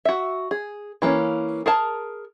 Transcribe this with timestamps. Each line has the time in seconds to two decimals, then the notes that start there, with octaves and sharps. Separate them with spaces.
0.05 F#4 E5
0.51 G#4
1.02 E3 A#3 C4 C#4
1.66 G#4 A#4 A5